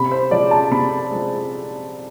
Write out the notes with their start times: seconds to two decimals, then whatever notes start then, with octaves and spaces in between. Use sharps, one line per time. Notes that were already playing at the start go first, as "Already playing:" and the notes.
Already playing: C3 B5
0.11 C5
0.31 F3 G#3 D5
0.51 A5
0.71 C3 B5
1.11 F3 G#3